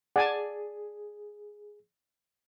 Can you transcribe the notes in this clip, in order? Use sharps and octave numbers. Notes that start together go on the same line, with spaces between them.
G#4 D5 F#5 G#5 A5